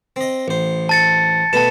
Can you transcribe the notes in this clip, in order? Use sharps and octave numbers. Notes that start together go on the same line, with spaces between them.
C4 D#5
A1 C5
A5 A6 C#7
B2 A3 B3 A5 E7